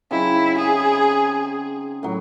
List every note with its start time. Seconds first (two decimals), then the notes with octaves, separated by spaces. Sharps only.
0.11 C#3 F#3 C4 D#4 E4
0.59 G#4
2.03 A2 F#3